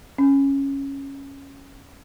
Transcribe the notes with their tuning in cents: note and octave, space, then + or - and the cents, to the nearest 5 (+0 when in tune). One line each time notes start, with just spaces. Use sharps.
C#4 -5